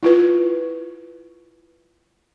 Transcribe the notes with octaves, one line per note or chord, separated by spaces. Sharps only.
E4 F4 B4